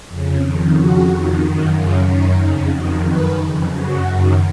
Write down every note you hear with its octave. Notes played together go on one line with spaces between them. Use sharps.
F2 C#3
F2 D#3
F2 C#3 F#4
F2 D#3
F#2 D#3
F#2 C#3 F4
F#2 D#3 C#4
F2 C#3 D#4
F2 D#3 F#4
F#2 D#3 B4
F2 C#3
F#2 C#3 F#4
F#2 D#3